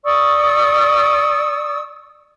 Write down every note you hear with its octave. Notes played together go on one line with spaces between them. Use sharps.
D5 C#6 D#6 E6